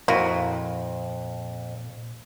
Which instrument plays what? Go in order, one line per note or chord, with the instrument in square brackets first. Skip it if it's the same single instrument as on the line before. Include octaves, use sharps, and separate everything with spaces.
[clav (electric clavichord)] F2 [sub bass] A#2 [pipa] A#3 E4 F#4